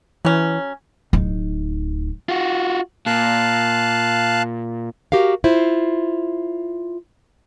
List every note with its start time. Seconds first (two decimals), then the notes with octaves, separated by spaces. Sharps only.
0.25 E3 F#3 C#4
1.13 D1 D#4
2.28 F4 F#4
3.06 A#2 F5 A5 F#6
5.12 F#4 G4 A#4 F5
5.44 E4 F4 C5